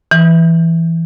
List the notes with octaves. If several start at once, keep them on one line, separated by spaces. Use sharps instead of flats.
E3